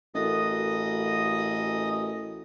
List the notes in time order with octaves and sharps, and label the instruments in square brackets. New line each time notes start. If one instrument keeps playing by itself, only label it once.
[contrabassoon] A1 [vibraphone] F#4 A4 A#4 [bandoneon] D#5 D#6